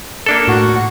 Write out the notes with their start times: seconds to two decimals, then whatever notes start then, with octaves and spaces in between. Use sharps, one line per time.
0.26 A#3 D4 A4
0.48 A2 F#4